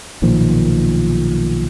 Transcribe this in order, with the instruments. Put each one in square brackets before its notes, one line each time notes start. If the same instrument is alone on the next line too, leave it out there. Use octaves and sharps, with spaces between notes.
[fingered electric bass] B1 A#2 D#3 F3